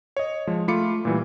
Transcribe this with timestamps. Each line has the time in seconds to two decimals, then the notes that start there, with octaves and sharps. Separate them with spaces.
0.17 C#5 D#5
0.47 F3 G#3
0.68 A3 F4 B5 D6 C#7
1.05 A#2 E3 G3